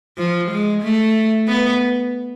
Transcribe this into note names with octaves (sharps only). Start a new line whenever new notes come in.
F3
G#3
A3
B3